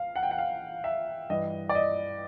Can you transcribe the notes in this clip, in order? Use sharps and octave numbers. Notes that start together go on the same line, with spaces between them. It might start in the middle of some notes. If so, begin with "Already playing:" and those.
Already playing: F5
F#5
G5
F#5
F5
E5
G2 E3 D#5
D5
D#5